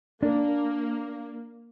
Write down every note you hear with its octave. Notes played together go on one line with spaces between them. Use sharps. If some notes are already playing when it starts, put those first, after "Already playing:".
A#3 D4